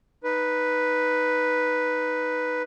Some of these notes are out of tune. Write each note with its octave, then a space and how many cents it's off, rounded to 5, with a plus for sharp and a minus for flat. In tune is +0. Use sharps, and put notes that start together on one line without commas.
D#4 +0 B4 +0